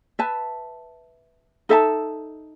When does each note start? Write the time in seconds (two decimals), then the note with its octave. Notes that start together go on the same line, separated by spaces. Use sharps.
0.19 B4 E5 A5
1.69 D#4 A4 E5 A5